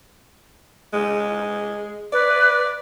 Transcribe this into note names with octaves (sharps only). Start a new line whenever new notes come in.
G#3
B4 D5